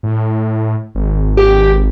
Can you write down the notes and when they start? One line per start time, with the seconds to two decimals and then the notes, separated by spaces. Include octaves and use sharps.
0.03 A2
0.95 G#1
1.37 G4